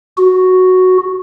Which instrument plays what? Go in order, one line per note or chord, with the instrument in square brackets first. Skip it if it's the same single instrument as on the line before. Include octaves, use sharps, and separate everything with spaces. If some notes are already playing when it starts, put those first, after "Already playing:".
[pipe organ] F#4